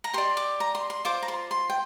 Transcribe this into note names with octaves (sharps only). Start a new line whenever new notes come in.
A#5
G4 D5 C6
D6
A#5
C6
C6
F4 C5 D6
A#5
C6
C6
G5